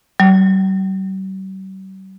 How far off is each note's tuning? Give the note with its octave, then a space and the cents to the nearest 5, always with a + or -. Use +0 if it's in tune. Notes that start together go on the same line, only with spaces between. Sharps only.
G3 -45